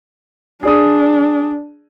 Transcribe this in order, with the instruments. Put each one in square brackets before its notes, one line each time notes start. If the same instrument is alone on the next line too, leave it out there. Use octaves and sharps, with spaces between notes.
[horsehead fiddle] D4 [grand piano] G#4 D5 D#6